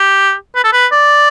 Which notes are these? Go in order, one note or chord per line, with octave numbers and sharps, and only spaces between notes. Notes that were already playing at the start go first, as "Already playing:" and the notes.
Already playing: G4
B4
A4
B4
D5